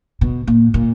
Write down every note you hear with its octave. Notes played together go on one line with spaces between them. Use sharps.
B2
A#2
A#2